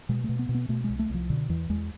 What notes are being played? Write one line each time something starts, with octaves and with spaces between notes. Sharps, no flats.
B2 G#3
A3
B2
B3
B2
B3
B2 A3
G#3
C2
A3
C2 F3
B2 D3
E2 E3
E2 G#3